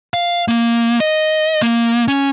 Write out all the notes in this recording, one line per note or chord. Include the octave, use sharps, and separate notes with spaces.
F5
A#3
D#5
A#3
C#4